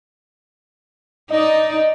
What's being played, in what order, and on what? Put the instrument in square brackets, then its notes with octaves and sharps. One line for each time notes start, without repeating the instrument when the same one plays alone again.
[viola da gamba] D#4 D5 [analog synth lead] D#5